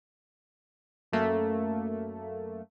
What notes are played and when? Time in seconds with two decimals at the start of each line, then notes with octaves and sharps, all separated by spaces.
1.12 F#2 A3 A#3